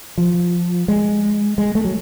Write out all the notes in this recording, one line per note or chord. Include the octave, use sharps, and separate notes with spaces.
F3
G#3
G#3
A3
F#3